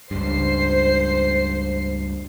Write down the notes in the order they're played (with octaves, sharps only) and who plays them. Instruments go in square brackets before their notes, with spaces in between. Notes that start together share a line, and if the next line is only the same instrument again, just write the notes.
[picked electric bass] C#2 G2 [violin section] C5 C7